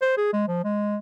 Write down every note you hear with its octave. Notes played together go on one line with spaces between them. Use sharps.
C5
G#4
G#3
F3
G#3